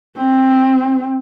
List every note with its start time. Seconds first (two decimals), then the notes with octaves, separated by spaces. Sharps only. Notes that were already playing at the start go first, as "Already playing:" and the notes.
0.18 C4